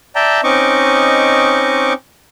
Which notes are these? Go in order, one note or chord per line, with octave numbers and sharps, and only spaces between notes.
D5 E5 G5 A5 A#5
C4 C#4 D#4 D#5 C#6 D6